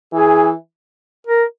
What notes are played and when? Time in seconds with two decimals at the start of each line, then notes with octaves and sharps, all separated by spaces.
0.13 E3 G#4
1.27 A#4